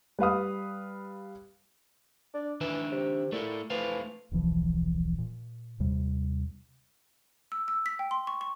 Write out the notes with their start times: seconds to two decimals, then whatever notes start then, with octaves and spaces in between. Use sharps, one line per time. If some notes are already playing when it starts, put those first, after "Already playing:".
0.19 G3 B4 F5 D#6
2.34 D4
2.61 D#3 E3 D4 E5
2.92 C3
3.32 A#2 A3 E4 A4
3.70 E3 A3 C5 F5
4.32 D#1 B1 E3 F3
5.18 A#2
5.80 D#2 C3 G3
7.52 E6
7.68 E6
7.86 B6
7.99 G5
8.11 C6
8.27 C#6
8.41 C#6